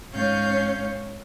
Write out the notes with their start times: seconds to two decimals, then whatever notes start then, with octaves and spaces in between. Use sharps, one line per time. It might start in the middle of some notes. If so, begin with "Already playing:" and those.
0.13 G#2 C#4 C#5 F5 G6